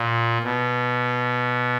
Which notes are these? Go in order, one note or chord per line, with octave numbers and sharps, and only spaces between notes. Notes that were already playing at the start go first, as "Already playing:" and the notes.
Already playing: A#2
B2